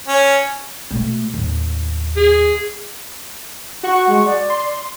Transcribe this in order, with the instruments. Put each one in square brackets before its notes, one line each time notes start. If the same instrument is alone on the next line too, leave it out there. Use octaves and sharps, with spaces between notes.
[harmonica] C#4
[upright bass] B2 A3
D#2 A2
[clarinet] G#4
[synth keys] F#4 F#5 C#6
[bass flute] G#3
D5
[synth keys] C6